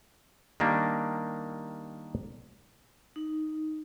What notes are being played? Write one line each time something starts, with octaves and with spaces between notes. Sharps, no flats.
D#3 G3 A#3 D4
D#4